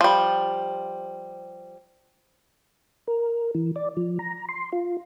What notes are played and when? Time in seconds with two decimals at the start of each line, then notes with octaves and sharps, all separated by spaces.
0.01 F3 G3
3.08 A#4
3.55 E3
3.76 D5
3.97 F3
4.19 A#5
4.49 C6
4.73 F4